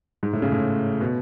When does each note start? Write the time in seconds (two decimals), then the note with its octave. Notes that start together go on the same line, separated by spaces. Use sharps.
0.23 G#2
0.33 A2
0.42 C#3
0.52 A2
1.01 B2